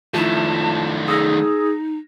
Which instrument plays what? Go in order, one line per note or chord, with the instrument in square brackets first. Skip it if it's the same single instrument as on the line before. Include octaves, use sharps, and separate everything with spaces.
[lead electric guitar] D#3 A3 [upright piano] F3 E4 [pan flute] A5
[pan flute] D#4 [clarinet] G#4 [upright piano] D#6 E6 A#6